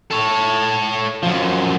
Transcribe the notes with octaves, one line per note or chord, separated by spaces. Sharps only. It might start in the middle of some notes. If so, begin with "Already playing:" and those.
A4 C#5
F#2 F3